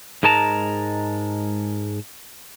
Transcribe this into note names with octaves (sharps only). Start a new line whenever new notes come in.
G#2 G#3 A#4 A5 A#5